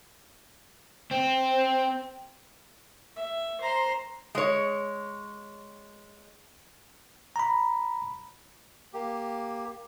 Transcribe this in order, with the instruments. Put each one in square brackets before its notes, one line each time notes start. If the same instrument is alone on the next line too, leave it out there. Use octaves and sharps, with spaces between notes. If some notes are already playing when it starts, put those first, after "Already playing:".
[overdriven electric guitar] C4
[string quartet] E5
C5 A#5 C6
[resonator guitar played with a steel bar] G#3 C#5
[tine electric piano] A#5 B5
[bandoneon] A#3 G4